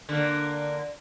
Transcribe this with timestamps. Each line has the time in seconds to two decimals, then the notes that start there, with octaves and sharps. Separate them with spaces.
0.09 D3 A#3